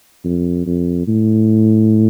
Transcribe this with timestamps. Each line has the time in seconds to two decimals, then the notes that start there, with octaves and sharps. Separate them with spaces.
0.24 F2
0.66 F2
1.07 A2